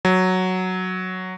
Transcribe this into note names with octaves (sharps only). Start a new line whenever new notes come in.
F#3